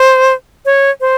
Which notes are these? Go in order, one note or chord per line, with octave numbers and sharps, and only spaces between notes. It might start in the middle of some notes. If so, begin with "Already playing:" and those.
Already playing: C5
C#5
C5